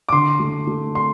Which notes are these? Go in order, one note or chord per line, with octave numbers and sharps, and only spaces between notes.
D6
D3 C6
A3
A3
C6